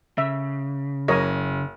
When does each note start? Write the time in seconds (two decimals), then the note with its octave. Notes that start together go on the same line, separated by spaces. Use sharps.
0.18 C#3 E5
1.08 F#1 A#4 C#5 D#5